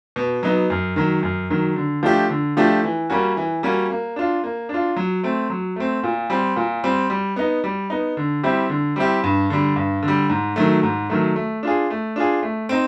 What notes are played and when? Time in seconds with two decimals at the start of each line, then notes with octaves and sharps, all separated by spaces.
0.16 B2
0.43 F#3 B3 D#4
0.70 F#2
0.96 D#3 F#3
1.23 F#2
1.50 D#3 F#3
1.76 D3
2.03 F3 A3 D4 G4
2.29 D3
2.57 F3 A3 D4 G4
2.84 E3
3.10 G3 A#3 C#4 F#4
3.37 E3
3.63 G3 A#3 C#4 F#4
3.90 A#3
4.16 D4 F4
4.44 A#3
4.69 D4 F4
4.96 F#3
5.24 A3 C4
5.50 F#3
5.76 A3 C4
6.03 A#2
6.30 G3 C4
6.56 A#2
6.84 G3 C4
7.10 G3
7.36 B3 D#4
7.64 G3
7.90 B3 D#4
8.17 D3
8.43 G3 C4 E4 G4
8.70 D3
8.96 G3 C4 E4 G4
9.24 G2
9.50 D3 G3
9.76 G2
10.03 D3
10.08 G3
10.30 G#2
10.56 D#3 F#3 A3
10.83 G#2
11.10 D#3 F#3 A3
11.36 A3
11.63 D4 F4 G#4
11.90 A3
12.16 D4 F4 G#4
12.43 A3
12.69 C4 D#4